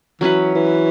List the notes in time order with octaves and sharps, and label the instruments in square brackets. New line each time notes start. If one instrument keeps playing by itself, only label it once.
[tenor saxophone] E3 [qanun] F#3 C#4 F#4 B4
[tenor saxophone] E3